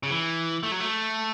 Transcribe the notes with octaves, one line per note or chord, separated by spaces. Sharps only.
C#3
E3
A3
F#3
A3